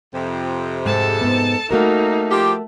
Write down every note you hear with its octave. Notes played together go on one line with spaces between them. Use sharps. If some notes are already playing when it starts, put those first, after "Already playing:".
F2 C3
G#2 G#3 A4 A5
G#2 B3
A3 A#3 D#4 F#4 A#4
F3 G4